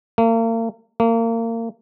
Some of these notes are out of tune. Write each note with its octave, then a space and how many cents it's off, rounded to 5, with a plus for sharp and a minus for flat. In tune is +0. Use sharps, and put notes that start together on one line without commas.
A#3 -40
A#3 -30